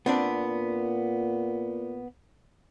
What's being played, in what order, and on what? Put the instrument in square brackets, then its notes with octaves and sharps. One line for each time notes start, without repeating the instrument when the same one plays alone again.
[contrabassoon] A#2 [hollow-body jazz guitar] B3 C4 D4